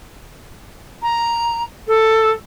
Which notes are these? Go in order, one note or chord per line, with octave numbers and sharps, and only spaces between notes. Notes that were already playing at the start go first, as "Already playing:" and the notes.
A#5
A4